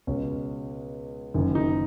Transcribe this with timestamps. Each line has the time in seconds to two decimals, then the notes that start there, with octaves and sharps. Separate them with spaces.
0.07 C#2 B2 C#4
1.34 F#1 F#2 D#3
1.55 D#4